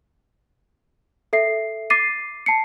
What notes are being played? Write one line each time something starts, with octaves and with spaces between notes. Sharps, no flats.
A4 E5 C7
D6 A6 C7 D#7
A5 C7 C#7